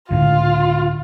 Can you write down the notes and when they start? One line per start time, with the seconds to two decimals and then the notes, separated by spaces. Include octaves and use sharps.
0.10 C#2 A2 D3 F4